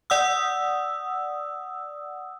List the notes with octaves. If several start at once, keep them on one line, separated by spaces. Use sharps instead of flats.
D5 F#5 D#6 E6